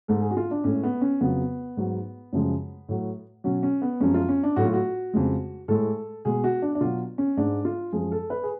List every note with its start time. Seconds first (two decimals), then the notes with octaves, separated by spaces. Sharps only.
0.08 G#2 G#3 A4
0.22 G#4
0.31 F#4
0.37 F4
0.51 D4
0.64 A2 G#3 C#4
0.83 B3
1.01 C#4
1.21 F2 C#3 F#3 B3
1.77 G#2 F#3
2.33 F#2 C#3 F3 G#3
2.89 A2 F#3
3.44 B2 F#3 C#4
3.63 C#4
3.82 B3
4.00 F#2 F3 G#3 C#4
4.14 F4
4.29 C#4
4.43 D4
4.56 A2 F#3 F#4
4.65 F4
4.73 F#4
5.13 F2 C#3 G#3
5.68 A2 G#3 A4
6.25 B2 G#3 G#4
6.44 F#4
6.62 D4
6.75 D4
6.81 B2 F#3 F4
7.18 C#4
7.37 G#2 G#3 D4
7.65 F4
7.93 F#2 F3 G#3 G#4
8.12 A4
8.30 B4
8.43 G#4